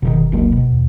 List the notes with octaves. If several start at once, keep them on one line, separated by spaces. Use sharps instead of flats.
F#1 B2 D3 D#3
C#2 F#3 A#3
B2
D#2